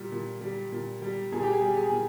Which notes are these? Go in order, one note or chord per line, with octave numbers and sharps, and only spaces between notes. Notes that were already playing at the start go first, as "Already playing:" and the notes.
Already playing: A#2 G3
A#2
G3
A#2
G3
A#2 G#4
G4
G#4
G3
G#4
A#2